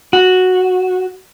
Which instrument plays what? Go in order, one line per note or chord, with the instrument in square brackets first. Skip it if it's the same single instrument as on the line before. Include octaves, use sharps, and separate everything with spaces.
[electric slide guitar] F#4